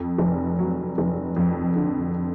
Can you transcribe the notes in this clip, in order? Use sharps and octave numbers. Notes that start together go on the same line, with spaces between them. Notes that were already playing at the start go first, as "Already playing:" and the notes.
Already playing: F2
F1
F#3
F1
F2
D3